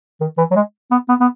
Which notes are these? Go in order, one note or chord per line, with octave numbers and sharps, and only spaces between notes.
D#3
E3
F#3
G#3
B3
B3
B3